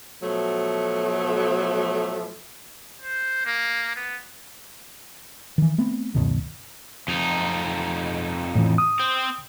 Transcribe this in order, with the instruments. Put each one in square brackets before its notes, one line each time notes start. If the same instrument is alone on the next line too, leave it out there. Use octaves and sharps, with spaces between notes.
[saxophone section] B2 F3 F#3 A3
[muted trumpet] C5
A#3
B3
[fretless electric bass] D#3 E3
A3 B3 C4
C#2 F#2 B2 D#3
[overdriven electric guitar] F2 D#4
[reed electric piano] A2 E3
D#6
[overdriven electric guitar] C4